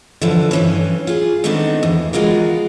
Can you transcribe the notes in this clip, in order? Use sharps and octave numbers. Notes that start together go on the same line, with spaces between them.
D3 E3 F3
G2 E3 C#4
F4 G#4
D#3 A3 B3 C4 D4 D#4
E2
E3 G#3 F4 F#4 A#4